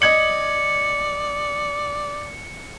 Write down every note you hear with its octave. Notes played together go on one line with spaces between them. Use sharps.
D5 D#5 G#6 C#7 F#7